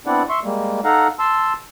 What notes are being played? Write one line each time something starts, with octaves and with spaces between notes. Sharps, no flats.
B3 C4 D4 E4 D5 F#5
E5 C6 C#6
G3 G#3 A#3
D#4 A4 F5 F#5 A#5
A5 C6 E6